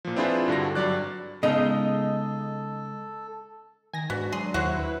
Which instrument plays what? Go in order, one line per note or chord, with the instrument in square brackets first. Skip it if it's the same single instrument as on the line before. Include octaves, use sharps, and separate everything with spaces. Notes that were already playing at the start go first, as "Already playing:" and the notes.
[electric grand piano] A#2 F3
C4 D4 E4 F4 G#4 B4
G2 D3 F#4 A#6
G2 F#3 D5 F#6
[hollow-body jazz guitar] C#3 G#3 D#4 [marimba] B3 [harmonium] A4 [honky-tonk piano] D#5
[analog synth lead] D#3 [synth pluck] G#5 A#6
[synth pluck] G#2 [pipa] B3 [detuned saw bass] D4 [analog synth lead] F#4
[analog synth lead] F#3 [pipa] G#4 [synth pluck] C6
[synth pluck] D#2 C5 [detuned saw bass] E4 [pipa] F#4 C#5 F#5
[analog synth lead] B4